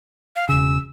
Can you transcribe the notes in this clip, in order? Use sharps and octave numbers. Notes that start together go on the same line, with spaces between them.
F5
E1 C#3 E6